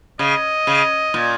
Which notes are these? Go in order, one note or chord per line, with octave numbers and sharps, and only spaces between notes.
C#3 D#5
C#3
A#2